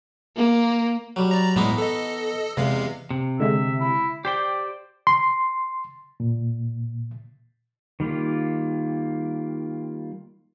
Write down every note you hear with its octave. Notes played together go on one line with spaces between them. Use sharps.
A#3
F#3 G3
D5 A#5
A2 E3 G#3 B3 D#4
A4 D#5
E2 C3 G#3 F5
C3
D3 G#3 E5
E4
G4 C5 D5 G5
C6
A#2
D#3 G3 A#3 F4